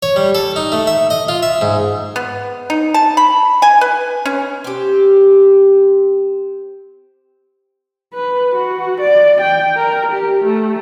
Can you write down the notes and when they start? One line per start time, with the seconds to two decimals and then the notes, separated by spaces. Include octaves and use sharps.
0.03 C#5
0.16 G3
0.35 A4
0.56 D#4
0.72 A3
0.87 E5
1.10 D#5
1.29 F4
1.43 E5
1.61 G#2
2.16 B3
2.70 D#4
2.94 A5
3.17 B5
3.62 G#5
3.81 B4
4.26 C#4
4.64 C4 G4
8.14 B4
8.56 F#4
9.01 D5
9.41 G5
9.76 A#4
10.12 G4
10.45 A3